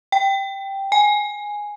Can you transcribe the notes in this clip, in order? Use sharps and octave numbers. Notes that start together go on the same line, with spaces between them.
G5
G#5